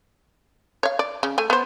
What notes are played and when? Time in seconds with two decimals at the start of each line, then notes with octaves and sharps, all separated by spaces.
0.83 C#5 F5
0.99 D5
1.23 C#3
1.38 A3 G#5
1.50 B3 C5